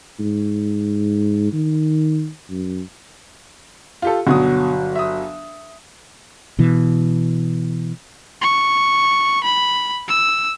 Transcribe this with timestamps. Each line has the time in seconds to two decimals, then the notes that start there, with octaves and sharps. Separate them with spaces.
0.19 G#2
1.52 D#3
2.50 F#2
4.02 F4 G4 A4
4.27 G1 B2 F#3 D#6
4.96 E5 D#6
6.59 B2 E3
8.42 C#6
9.44 B5
10.08 E6